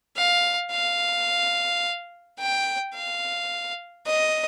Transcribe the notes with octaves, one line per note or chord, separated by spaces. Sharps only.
F5
F5
G5
F5
D#5